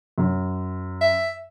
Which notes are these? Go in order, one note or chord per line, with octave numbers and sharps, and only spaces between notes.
F#2
E5